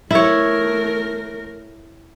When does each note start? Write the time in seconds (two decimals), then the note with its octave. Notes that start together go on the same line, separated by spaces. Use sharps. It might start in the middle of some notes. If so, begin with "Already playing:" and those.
0.11 A3 E4 A#4 C#5